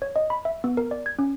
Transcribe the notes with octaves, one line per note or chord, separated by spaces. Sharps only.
C#5
D#5
B5
E5
B3
A#4
D5
G#6
C#4